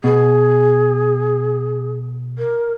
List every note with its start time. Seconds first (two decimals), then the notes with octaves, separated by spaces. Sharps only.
0.04 B2 G#4
2.38 A#4